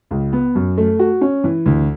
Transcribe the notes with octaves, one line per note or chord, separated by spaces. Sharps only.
C#2
B3
F#2
A3
F#4
C#4
E3
D2